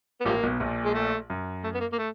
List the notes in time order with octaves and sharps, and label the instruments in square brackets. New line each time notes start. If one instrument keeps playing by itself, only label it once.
[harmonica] B3
[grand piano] A1 A2 [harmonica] F3 G3 A#3
[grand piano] B1 B2
A#1 A#2
[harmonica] G#3
A3
[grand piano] F#2
[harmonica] A3
B3
A#3
A#3
A3